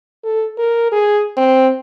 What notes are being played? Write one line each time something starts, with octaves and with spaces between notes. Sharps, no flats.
A4
A#4
G#4
C4